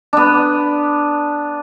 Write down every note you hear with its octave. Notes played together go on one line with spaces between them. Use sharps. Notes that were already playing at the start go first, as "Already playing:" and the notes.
B3 D4